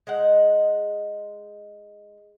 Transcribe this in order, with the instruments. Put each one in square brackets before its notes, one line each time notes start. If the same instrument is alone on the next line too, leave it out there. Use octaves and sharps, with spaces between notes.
[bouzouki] G#3 D#4 F#5